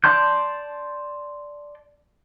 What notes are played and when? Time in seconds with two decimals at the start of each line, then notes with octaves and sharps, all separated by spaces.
0.04 D5 A5 C6 G6